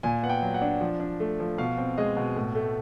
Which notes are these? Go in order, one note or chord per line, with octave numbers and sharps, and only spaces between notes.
A#2 G#5
B3 F#5
G5
F#3
F#5
D4
F3
D4
A3
F3
B2 F5
C4
G#3 D#5
B2
A2
A3